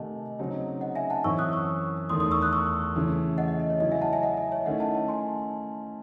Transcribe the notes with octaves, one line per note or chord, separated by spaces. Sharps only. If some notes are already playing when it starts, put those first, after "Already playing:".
Already playing: C3 D#3 A3 D#5 F#5 G#5 A5
C#3 F#3 C4 D#4
D#5 F#5
E5 G#5
F#5 A5
F#2 E3 C4 E4 C#6 E6
D#6 F#6
C#6 E6
E2 D#3 A3 C6 D#6
C6 D#6
C#6 E6
D#6 F#6
C#6 E6
C#3 E3 A3
D#5 F#5
D#5
D#5
C#5
C#3 F#3 C#4 E4 D#5
E5 G#5
F#5 A5
E5 G#5
D#5 F#5
D#5
C#5 E5
D#3 A3 C#4 E4 D#5 F#5
F#5 A5
F#5 A5
G#5 C6